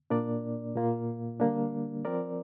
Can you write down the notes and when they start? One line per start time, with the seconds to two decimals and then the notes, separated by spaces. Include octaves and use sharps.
0.10 A#2 A#3 D4 A#4 D5
0.76 A#2 A#3 F4
1.40 D3 G3 A#3 D4
2.05 F3 C4 A#4 D5